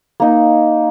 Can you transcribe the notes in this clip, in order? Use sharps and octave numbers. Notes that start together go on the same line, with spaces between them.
A#3 D#4